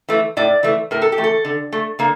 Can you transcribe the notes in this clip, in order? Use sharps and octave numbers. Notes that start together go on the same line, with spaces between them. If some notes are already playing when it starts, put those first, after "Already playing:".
E3 A3
A2 D5
E3 A3
A2 A#4
A4
G4
E3 A3
A4
D3
A3
D3 A#3